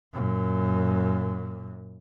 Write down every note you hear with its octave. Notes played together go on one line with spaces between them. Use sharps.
F#2 A#2